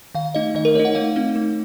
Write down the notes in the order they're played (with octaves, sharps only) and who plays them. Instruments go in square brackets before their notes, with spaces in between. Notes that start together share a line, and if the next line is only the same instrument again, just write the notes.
[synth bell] D#3 F5
A3 D#4 D#5
D#3 D#5
A#4
A3 D#4 C#5
F#5
A3 F5
C4 D#4
A3